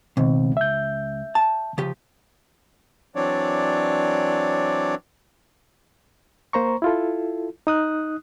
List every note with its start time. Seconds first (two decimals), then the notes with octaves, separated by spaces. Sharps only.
0.17 C#2 B2 D#3 C4
0.57 E5 G6
1.35 A5
1.78 C#3 F3 G4
3.16 E3 F#3 C4 D4 C#5 D5
6.53 A#3 C5 A#5 C#6
6.82 E4 F4 A4
7.67 D#4 D#6 F#6